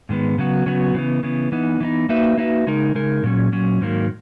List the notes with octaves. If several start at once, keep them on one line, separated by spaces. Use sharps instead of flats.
G#2 D#3 G#3 B3
C#3 F#3 B3 F#4
C#3 F#3 B3 F#4
C#3 E3 B3
C#3 E3 B3
E3 B3 D#4
E3 B3 D#4
A#3 D#4 F#4 B4 E5
A#3 D#4 F#4 B4 E5
C#3 G#3 D#4 A#4
C#3 G#3 D#4 A#4
A#2 F#3 C#4
A#2 F#3 C#4
G#2 D#3 F#3 A#3